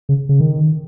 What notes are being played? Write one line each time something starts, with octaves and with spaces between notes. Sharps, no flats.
C#3
C#3
D#3